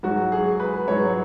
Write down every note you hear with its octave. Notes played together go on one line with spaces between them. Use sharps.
G#2 F#3 F#4
G#4
B4
G#2 F#3 C#5